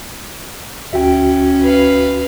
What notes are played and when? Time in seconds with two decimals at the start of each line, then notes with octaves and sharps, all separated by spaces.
0.93 D2 C#4 F#4 E5 G5
1.61 B4 F5